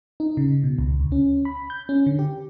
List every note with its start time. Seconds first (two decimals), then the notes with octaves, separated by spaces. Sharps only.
0.20 D#4
0.37 C#3
0.64 B2
0.79 C#2
1.00 D2
1.12 C#4
1.45 B5
1.70 G6
1.89 C#4
2.06 D3
2.19 G4